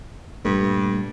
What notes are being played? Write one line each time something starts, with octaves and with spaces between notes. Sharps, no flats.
G2 A#2 G3 A3